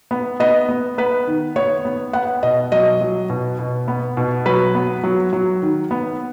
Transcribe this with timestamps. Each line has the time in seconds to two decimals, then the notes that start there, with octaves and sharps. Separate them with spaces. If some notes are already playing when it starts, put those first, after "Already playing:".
0.11 B3
0.40 B3 D#5
0.69 B3
0.98 B3 B4
1.27 D#3
1.56 B3 C#5
1.85 B3
2.13 B3 F#5
2.43 B2 D#5
2.72 F#3 D#5
3.01 F#3
3.30 B2
3.59 B2
3.88 B3
4.17 B2
4.46 F#3 B4
4.75 B3
5.04 F#3
5.33 F#3
5.62 D#3
5.91 B3